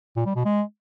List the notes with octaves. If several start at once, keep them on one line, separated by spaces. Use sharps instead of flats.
A#2
G3
B2
G#3